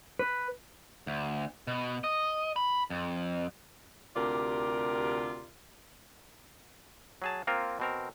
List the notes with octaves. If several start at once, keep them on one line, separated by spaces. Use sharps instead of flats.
B4
D2
B2
D#5
B5
F2
D2 C3 F4 G4 A#4 D5
F#3 G#4 A5
A#3 C4 F4 A#4
B2 C4 A#4